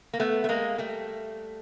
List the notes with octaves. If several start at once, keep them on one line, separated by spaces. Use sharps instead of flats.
A#3
A3 B3
A3
G#3 A#3
G3 A3